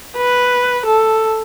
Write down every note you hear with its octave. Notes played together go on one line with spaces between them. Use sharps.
B4
A4